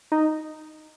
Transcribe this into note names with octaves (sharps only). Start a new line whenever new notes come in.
D#4